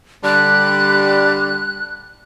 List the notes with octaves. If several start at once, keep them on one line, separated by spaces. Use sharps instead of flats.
D3 G3 F#6